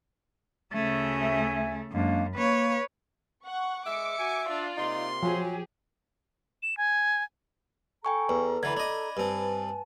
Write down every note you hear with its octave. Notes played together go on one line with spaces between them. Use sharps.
D2 C#3 A3 E5 G#5
F#2 G#3 A#3 D4
A#3 B4 C#5
F#5 C#6
G#3 E5 D6 C#7
F#4 G#5
D4 F4 D5
C3 A#3 D#4 C6
F3 F#3 G4 G#4
E7
G#5
A4 G5 G#5 A#5 C#6
E2 B4
D3 E3 B5 G#6
D4 D#5
G2 C4 B4 G#5 A5